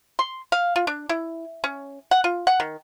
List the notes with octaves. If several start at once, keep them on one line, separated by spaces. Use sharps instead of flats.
C6
F5
F4
D4
E4
C#4
F#5
F4
F#5
D#3